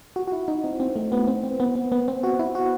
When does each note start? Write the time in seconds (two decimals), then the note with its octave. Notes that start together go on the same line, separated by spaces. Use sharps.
0.16 F#4
0.27 F#4
0.32 E4
0.48 D#4
0.64 C4
0.80 C4
0.96 A3
1.12 B3
1.27 C4
1.44 C4
1.60 B3
1.75 B3
1.92 B3
2.08 C4
2.23 F#4
2.39 E4
2.55 F#4